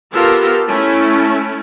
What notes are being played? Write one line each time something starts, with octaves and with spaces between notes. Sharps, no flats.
B3 F4 G4 A4 A#4
A3 C#4 E4